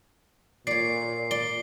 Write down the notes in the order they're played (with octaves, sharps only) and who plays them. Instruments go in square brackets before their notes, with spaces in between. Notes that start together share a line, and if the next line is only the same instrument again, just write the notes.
[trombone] A#2 [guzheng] C#5 D5 [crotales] C7
[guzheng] D5 [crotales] G7